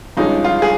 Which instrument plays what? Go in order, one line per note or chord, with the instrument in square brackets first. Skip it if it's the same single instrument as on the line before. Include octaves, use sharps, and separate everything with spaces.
[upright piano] G2 F3 G#3 C#4 D#4
F4
G#4